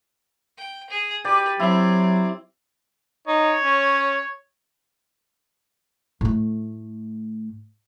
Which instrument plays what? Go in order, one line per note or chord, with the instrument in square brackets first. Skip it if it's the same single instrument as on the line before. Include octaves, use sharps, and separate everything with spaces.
[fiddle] G5
G#4
[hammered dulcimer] G4 D5 [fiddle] B4
[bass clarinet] F#3 [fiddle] C4 [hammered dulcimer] E4 E5
[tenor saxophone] D#4 [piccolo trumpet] C#5
[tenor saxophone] C#4
[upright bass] A2 A3